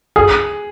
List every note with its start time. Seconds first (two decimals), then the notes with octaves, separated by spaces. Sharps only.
0.16 G#4